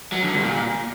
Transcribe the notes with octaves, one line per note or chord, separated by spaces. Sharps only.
F#3
D3
G2
A#2